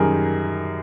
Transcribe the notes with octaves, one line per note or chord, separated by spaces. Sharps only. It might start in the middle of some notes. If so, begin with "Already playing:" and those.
Already playing: F#2 D#3 G3 G#4 A#4